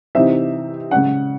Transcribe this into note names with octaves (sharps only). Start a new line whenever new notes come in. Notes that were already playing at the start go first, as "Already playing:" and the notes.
C3 E3 C4 D#4 E5
C#3 G#3 C#4 F#5